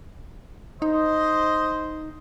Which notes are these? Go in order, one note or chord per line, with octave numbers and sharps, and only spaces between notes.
D#4 C5 D#5